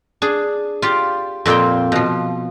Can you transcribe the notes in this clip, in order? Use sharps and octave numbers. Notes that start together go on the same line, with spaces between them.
D4 G#4
F4 G4 D5
F2 A#2 C4 C5 G5
B2 F3